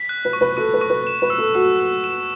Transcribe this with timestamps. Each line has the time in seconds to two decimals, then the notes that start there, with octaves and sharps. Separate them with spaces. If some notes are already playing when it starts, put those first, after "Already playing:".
Already playing: B6
0.09 F#6
0.25 B4
0.33 C#6
0.41 B4
0.57 A4 C#6
0.74 B4
0.81 C#6
0.90 B4
1.07 E7
1.22 B4
1.30 E6
1.38 A4
1.55 F#4 E6
1.80 E6
2.04 E7